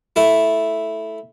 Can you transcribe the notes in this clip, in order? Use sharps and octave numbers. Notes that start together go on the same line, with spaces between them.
A3 E4